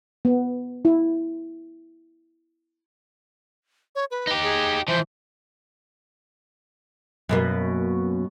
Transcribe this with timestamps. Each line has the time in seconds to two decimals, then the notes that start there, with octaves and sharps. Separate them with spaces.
0.25 B3
0.85 E4
3.95 C#5
4.11 B4
4.27 D#4 G4
4.43 G#4
4.88 E3 F3 C5
7.29 F#2 B2 A#3